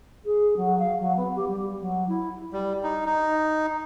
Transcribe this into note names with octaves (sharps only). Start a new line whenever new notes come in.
G#4
F#3
F5
F#3
B3
G4
G3
F#3
E4
G3
D#4
D#4